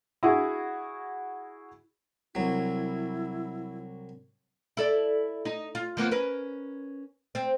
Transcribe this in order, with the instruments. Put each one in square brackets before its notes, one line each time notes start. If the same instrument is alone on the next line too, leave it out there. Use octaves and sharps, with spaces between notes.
[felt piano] E4 F#4 G#4
[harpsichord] C2 F#3 [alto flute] E4
[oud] E4 A4 D5
D#4
F4
F3 A#3 B3
C#4 A#4 B4
C4